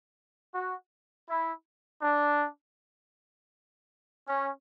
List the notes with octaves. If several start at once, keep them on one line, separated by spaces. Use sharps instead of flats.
F#4
E4
D4
C#4